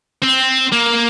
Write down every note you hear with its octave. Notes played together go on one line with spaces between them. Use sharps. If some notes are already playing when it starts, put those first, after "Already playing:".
C4
A#3